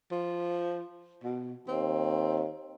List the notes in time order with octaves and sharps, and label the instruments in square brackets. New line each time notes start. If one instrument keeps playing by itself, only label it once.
[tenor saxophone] F3
B2
[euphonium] D#2 [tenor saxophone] C4